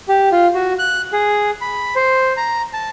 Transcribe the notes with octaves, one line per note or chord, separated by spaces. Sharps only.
G4
F4
F#4
F#6
G#4
B5
C5
A#5
A5